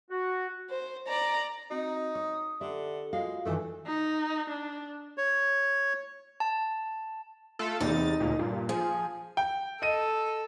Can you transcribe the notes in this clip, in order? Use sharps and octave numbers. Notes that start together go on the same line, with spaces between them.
F#4
C5
D5 A#5
C4 D#4 F#4
C#5 D#6
D3 G4 A4 E5
G#3 F4 F#4 F5
G2 D#3 E3 A3 A4 G#5
D#4
D4
C#5
A5
A3 F4 A4
E2 C3 D#4 A6
D2 A#2
G2 A#2
F3 G#4
G5
A4 D#5 D#7